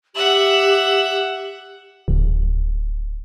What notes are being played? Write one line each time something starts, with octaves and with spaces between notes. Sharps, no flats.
G4 E5 F#5 F#7
D1